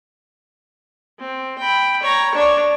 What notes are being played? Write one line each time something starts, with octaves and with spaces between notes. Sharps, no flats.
C4
G5 B5
C#5 A#5
D4 C#5